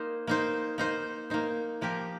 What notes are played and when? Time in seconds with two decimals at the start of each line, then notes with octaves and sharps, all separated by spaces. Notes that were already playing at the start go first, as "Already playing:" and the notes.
Already playing: A#3 D#4 C5
0.27 A#3 D#4 C5
0.78 A#3 D#4 C5
1.30 A#3 D#4 C5
1.81 F3 A#3 G4 A#4